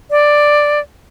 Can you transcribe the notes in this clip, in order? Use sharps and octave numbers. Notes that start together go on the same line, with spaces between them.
D5